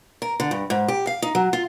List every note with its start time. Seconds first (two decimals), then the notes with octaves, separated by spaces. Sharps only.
0.22 A#4
0.40 D3
0.51 G2
0.70 G#2
0.88 G4
1.07 F5
1.22 D#4
1.35 F#3
1.53 F4